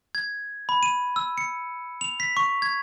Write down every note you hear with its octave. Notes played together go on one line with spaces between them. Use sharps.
G#6
B5
D#7
E6
C#7
F7
B6
C#6
G#6